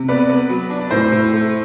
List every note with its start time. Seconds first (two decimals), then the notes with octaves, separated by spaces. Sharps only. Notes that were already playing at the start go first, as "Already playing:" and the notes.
Already playing: C3
0.08 B3 B4 D5
0.29 B3
0.49 F#3
0.70 D4
0.80 D5
0.91 A2 C5
1.12 A2
1.33 A3